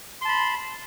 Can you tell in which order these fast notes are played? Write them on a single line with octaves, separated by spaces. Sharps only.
C6 A5 B5